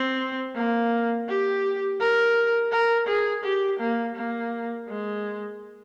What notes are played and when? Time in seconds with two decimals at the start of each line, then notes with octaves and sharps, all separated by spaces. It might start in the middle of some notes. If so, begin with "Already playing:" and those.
Already playing: C4
0.56 A#3
1.29 G4
2.01 A#4
2.72 A#4
3.08 G#4
3.44 G4
3.80 A#3
4.16 A#3
4.88 G#3